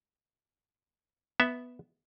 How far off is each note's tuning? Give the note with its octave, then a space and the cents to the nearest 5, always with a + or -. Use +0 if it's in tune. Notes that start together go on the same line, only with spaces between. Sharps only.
B3 +0 E5 +0